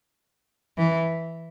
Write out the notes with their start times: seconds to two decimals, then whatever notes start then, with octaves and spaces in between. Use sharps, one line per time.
0.78 E3